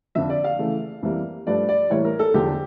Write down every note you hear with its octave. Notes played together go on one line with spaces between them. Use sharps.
F2 D3 F3 E5
D5
F5
C#3 E3 A3
F2 E3 G3 A#3
G2 F3 A3 D5
D5
A2 E3 G3 A#3 C#5
A#4
A4
E2 D3 F3 G4